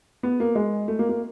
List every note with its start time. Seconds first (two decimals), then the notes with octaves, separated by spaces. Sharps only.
0.23 B3
0.40 A#3
0.55 G#3
0.88 A3
0.99 A#3
1.09 A#3